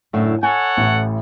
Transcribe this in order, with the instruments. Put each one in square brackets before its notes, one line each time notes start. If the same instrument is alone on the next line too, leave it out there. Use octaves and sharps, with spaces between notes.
[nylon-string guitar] F#2 A2 D3
[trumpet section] A4 C#5 F#5 [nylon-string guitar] G#5
[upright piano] A1 A2